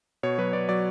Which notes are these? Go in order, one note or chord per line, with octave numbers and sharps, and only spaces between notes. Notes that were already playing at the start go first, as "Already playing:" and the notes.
B2 C#5
F#3 B4
B2 D5
F#3 D5